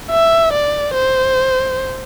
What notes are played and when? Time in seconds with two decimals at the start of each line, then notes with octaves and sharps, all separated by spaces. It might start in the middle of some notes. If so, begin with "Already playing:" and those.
0.11 E5
0.53 D5
0.94 C5